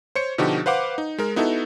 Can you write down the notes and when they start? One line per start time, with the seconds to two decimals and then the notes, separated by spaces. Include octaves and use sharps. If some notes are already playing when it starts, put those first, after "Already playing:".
0.15 C5 C#5 C#7
0.38 B2 D3 F3 D#4 F#4 G4
0.66 B4 C5 F5 F#5 D6
0.98 D#4
1.18 G#3 A#4
1.36 B3 D#4 E4 F#4 A4